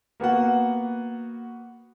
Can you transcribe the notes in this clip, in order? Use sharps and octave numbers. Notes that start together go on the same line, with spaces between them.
A#3 B3 F#4 F#5